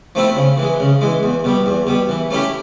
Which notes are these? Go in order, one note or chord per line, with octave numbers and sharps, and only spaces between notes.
F3 A3 C4 E4
C#3
E3 G#3
C#3
E3 G#3
E2
B2 G3
E2
B2 G3
E3
A3 C#4 E4 G4